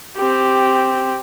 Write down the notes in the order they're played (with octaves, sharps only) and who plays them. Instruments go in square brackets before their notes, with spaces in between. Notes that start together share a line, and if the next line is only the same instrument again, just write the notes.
[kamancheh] C4 G4